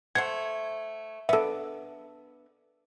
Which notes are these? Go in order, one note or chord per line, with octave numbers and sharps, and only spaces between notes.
A3 C5 F#5 G#6
B3 D4 A4 E5